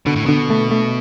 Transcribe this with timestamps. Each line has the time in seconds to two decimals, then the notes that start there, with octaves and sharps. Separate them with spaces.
0.06 B2 D3
0.16 A2
0.26 B2 D3
0.50 A3
0.71 A3